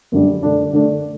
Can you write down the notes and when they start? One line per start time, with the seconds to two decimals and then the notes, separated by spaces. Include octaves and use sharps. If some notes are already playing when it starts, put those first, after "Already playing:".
0.12 F#2 D3 G3
0.43 D3 A3 D4
0.73 D3 A3 D4